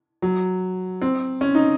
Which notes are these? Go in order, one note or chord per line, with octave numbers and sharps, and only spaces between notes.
F#3
C4
C#4
D#4